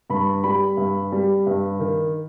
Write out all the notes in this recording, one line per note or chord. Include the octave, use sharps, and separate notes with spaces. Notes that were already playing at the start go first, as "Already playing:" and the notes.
G2 B5
G3 B5
G2
G3
G2
D#3